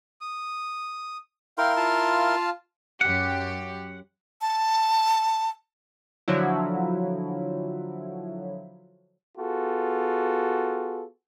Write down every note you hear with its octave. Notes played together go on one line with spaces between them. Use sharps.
D#6
E4 A#4 F5 G5 C6
F4 F5 A5
F#2 G4 F#5
A5
D3 F3 F#3 E4
B3 F4 F#4 G#4 A4